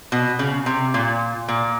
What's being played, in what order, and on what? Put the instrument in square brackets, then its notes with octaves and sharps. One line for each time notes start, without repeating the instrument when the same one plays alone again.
[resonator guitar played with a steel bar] B2
C#3
C3
A#2
A#2